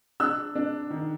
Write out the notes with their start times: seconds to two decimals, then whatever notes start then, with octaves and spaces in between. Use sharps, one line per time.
0.20 D4 E6 F#6
0.55 D4
0.90 D#3